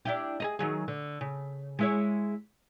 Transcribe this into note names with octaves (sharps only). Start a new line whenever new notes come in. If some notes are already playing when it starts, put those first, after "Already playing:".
D4 E4 G4
G#4 A#4 D#5
D#3 F#3 G#4
D3
C#3
G#3 E4 C#5